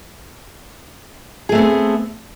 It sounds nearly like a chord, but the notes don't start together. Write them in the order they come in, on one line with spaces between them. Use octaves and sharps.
G#4 A3 C4 B3